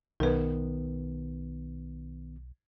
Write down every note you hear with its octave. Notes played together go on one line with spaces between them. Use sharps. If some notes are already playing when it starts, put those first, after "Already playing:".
B1 D#3 B3 A#4 B4